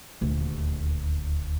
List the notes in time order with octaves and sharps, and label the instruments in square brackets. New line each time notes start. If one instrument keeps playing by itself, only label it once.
[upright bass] D#1 D2